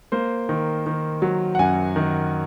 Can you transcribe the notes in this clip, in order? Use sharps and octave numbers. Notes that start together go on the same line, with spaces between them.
A#3 C5
D#3
D#3
F#3
F#5
F#2 G#5
D#3